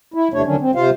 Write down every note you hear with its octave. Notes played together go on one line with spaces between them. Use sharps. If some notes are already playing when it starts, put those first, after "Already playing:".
E4
E2 C3 A3 D4 C#5
D3 D#3 F#3 C#4 D4
C4
C3 F4 C5 F5